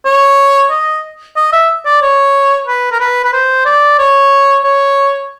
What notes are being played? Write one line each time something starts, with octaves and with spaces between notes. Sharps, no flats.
C#5
D#5
D#5
E5
D5
C#5
B4
A#4
B4
B4
C5
D5
C#5
C#5